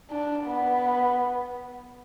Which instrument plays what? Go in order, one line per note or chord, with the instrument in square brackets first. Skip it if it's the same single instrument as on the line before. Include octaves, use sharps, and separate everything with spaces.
[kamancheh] D4
B3